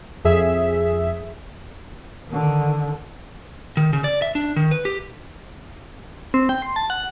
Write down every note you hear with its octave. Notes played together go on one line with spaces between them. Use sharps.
F2 G#4 E5
D3 D#3
D#3
C#3
D5
E5
D4
D#3
B4
G4
C4
G5
C6
A5
F#5